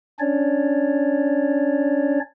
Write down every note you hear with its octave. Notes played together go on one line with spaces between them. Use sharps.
C#4 D4 C#5 D5